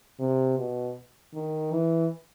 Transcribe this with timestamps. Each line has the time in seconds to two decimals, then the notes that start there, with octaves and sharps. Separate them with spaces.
0.20 C3
0.58 B2
1.34 D#3
1.72 E3